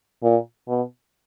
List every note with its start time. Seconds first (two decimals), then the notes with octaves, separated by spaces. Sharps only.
0.23 A#2
0.68 B2